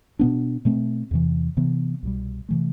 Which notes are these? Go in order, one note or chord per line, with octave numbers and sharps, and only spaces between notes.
B2 B3 D4
B2 A3 C4
E2 C3 E3
C3 E3 B3
C2 B2 G3
C3 E3 A3